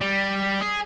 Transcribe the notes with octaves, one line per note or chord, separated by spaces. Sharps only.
G3
G#4